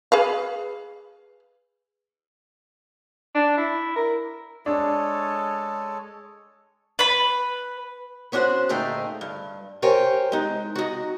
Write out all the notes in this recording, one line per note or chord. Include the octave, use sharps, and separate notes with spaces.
G#4 B4 F5
D4
E4
A#4
G#3 D4 A4 C#5
B4 B5
B3 C#4 D4 F#4 C5
D2 A#2 A3 D#4 G#4 G5
G2
G4 A#4 C5 C#5 G5 G#5
G#3 D#4
D#4 F#4